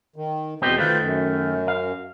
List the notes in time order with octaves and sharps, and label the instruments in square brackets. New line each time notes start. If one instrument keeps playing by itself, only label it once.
[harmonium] D#3
[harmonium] E2 B2 [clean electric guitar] B3 C4 G4
[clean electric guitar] D#3 A3 [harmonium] F4 B4 C5
[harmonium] F#2
[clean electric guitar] F5